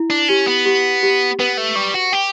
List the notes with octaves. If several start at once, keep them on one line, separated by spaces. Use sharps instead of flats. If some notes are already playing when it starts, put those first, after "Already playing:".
Already playing: E4
D4
C#4 G4
B3
G4
G4
B3 B4
A3
G3 C#6
F#4
G4 G5